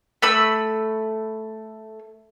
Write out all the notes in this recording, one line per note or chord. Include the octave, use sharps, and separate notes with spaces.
A3 B5 E6